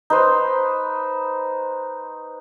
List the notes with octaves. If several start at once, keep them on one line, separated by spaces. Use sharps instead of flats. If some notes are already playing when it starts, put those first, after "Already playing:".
D#4 B4 C5